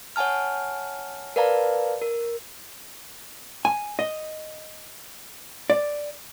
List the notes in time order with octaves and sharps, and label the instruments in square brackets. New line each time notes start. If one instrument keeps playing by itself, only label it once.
[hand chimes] C#5 F#5 G#5 A5 F6
A#4 B4 D5 F5 A5 A#5
A#4
[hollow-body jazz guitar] G#5
D#5
D5